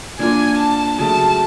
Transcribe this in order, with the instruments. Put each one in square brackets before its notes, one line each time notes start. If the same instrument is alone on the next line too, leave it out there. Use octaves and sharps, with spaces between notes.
[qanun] A#3 D4 F4 A#4 [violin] G#5
[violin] A5
[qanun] C#3 F#3 A3 [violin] A5